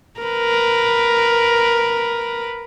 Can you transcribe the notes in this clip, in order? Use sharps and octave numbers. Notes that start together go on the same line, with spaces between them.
A#4 B4